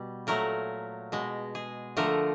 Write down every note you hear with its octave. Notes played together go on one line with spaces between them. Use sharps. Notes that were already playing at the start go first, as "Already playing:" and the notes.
Already playing: B2 G3
A#2 F#3 A3 A#4
B2 G#3
G#4
D3 F3 A3 A#4